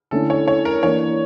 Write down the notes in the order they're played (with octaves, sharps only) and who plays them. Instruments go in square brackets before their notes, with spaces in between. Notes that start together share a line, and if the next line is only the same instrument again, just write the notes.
[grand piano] D3 A3 C#4 E4 [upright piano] A4
[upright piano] C#5
C#5
A#4
[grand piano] E3 A#3 D4 [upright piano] C#5